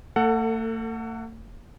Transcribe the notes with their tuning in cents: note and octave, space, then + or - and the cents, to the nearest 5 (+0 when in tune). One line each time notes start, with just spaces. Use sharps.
A3 +45 A4 +25 F#5 -5